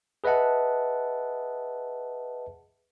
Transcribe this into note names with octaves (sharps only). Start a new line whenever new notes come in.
G#4 B4 D#5 E5 F#5 A5